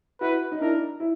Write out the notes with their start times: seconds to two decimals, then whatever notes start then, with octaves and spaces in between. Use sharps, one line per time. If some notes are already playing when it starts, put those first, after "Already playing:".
0.21 E4 F#4 B4
0.52 D#4
0.61 D4 E4 A#4
1.00 E4